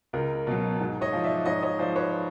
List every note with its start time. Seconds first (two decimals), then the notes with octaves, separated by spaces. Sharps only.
0.13 C#2 A#4
0.47 B2 F#3
0.80 G#2
1.01 C#5 D#5
1.13 F3
1.24 D5 E5
1.45 G#2 C#5 D#5
1.62 C#5 D#5
1.79 F3 C5 D5
1.95 B4 C#5